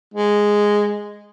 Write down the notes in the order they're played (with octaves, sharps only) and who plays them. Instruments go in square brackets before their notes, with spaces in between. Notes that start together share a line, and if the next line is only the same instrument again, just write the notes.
[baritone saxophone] G#3